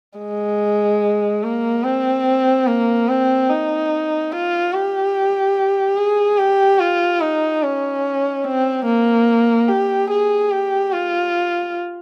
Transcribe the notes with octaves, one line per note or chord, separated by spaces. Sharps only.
G#3
A#3
C4
A#3
C4
D#4
F4
G4
G#4
G4
F4
D#4
C#4
C4
A#3
G4
G#4
G4
F4